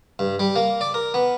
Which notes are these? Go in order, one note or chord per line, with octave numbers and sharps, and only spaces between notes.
G2
G3
A#3
D5
A#4
B3